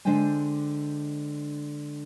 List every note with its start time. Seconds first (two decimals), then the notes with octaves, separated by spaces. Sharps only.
0.05 D3 G#3 D4 C5 G5 G#5